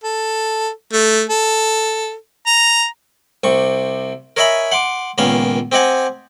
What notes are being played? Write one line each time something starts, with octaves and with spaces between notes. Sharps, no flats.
A4
A3
A4
A#5
C2 C3 C#6
A#4 C#5 D#5 E5 G#5 B5
F#5 C6 D6
C#2 A#2 D#3 B3 C#4 F5
C4 G4 D#5 F#5 G#5